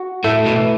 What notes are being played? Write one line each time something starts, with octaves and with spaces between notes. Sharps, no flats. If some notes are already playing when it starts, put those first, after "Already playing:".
Already playing: F#4
A2 A3
B2
E3